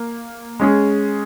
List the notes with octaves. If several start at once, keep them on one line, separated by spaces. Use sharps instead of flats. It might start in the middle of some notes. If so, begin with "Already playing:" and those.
Already playing: A#3
G#3 C#4 G#4